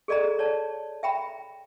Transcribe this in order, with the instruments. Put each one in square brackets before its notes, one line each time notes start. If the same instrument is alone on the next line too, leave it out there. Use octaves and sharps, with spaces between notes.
[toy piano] G#4 A4 D5 D#5 A#5
C#5 D5 A5
E5 G5 A#5 B5